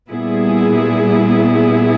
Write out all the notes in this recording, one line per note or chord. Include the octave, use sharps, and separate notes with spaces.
A#2 G3 B3 E4 G#4